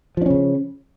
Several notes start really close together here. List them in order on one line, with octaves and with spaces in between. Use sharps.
F3 D4 C#4 C#3